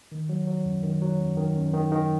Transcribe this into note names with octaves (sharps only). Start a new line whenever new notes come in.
D#3
F#3
F#3
F#2
D#3
F#3
F#2
D#3
F#2
D#3
D#3